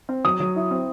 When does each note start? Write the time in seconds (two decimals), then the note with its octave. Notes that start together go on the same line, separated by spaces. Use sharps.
0.09 C4
0.24 F#3 D#6
0.40 F#3
0.56 E4
0.71 C4